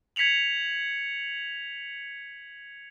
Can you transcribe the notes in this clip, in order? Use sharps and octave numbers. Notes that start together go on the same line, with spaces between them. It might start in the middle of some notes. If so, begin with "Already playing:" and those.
G#6 B6 C#7 F7 F#7